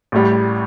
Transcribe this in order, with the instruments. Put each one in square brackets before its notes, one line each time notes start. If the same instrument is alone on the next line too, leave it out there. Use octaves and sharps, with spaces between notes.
[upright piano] A1 A2 G3